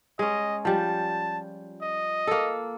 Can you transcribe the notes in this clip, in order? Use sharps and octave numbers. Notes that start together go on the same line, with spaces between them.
G#3 C#4 D#5
F3 G3 A5
D#5
A#3 A4